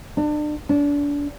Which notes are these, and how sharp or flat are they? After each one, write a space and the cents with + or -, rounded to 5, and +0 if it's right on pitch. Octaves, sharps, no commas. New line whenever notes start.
D4 +35
D4 -30